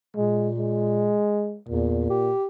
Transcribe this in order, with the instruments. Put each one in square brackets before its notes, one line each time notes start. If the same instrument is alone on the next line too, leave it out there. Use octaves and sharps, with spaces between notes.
[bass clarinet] A#2 [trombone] G#3
[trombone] G#3
[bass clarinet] E2 [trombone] A#2
[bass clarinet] G4